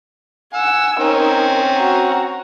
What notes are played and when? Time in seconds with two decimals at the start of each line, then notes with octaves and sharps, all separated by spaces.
0.54 F#5 G#5 E6
0.99 C4 C#4 D#4 A#4
1.77 F#4 A#5